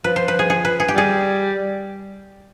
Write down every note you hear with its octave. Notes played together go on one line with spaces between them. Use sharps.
F3 B4
C5
B4
G#4
G#4
B4
G#4
G4
G3 G#4